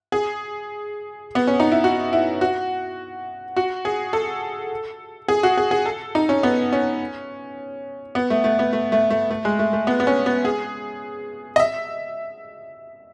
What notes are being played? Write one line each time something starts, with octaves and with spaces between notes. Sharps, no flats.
G#4
B3
C#4
D#4
E4
F#4
E4
F#4
F#4
G#4
A4
G#4
F#4
G#4
G#4
A4
D#4
C#4
B3
C#4
B3
A3
A3
B3
A3
A3
A3
A3
G#3
A3
A3
B3
B3
C#4
B3
G#4
D#5
E5